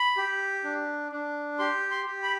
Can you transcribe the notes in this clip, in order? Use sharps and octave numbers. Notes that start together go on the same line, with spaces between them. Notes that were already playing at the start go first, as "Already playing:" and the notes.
Already playing: B5
G4
D4
D4
G4 C6
C6
G4
B5